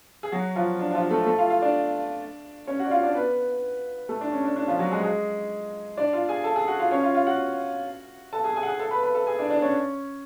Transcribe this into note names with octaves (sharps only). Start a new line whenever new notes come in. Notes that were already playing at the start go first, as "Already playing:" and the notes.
G#4
F#3 F#4
F3 F4
D4
D4
F3 F4
A3 A4
A3 A4
F4 F5
F4 F5
D4 D5
C#4 C#5
F#4 F#5
D5
F4 F5
D4 D5
B3 B4
A3 A4
D4
C#4
D4
D4
F3 F4
F#3 F#4
G#3 G#4
G#3 G#4
D4 D5
F4 F5
G#4 G#5
A4 A5
G#4 G#5
F#4 F#5
F4 F5
C#4 C#5
F4 F5
F4 F5
F#4 F#5
A4 A5
G#4 G#5
G#4 G#5
F#5
G#4 G#5
A4 A5
B4 B5
B4 B5
A4 A5
G#4 G#5
D4 D5
D4 D5
C#4 C#5